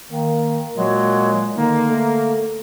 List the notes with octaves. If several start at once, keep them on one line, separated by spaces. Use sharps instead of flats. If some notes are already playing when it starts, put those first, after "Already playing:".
D#3 A#3
A#2 F#3 G#3
D3 D#3 A#3
A3